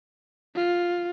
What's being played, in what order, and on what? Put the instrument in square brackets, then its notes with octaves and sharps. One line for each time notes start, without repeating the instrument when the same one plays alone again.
[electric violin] F4